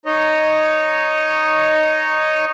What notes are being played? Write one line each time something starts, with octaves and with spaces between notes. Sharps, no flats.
D#4 C#5 D#5